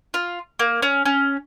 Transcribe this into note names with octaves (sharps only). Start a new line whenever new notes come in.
F4
A#3
C#4
C#4